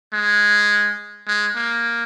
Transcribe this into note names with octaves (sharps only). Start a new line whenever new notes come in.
G#3
G#3
A#3